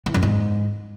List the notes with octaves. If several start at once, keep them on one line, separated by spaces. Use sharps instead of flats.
E3
F#2
G#2